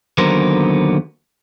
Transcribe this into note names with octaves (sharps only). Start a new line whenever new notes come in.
D#2 D3 F#3 B3 A#4 C5